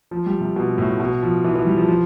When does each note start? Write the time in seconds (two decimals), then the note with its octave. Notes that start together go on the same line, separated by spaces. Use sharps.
0.11 F3
0.26 G3
0.41 C3
0.56 B2
0.78 A2
1.00 B2
1.23 F3
1.44 E3
1.55 E3
1.66 G3
1.77 F3
1.88 F3